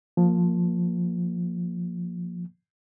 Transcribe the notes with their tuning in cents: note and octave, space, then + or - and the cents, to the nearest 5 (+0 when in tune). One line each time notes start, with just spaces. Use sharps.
F3 +10 A#3 -10